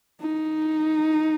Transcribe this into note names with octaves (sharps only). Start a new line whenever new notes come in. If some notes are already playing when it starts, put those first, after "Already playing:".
D#4